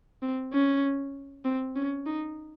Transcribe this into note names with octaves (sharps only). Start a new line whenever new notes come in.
C4
C#4
C4
C#4
D#4